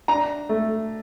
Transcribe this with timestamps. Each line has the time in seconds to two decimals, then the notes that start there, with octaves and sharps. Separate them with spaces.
0.08 D4 A#5
0.49 A3